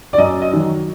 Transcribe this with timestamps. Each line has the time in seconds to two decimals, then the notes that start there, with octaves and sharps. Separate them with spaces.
0.13 D5
0.18 F#2 D#5
0.42 D#5
0.53 D#3 F#3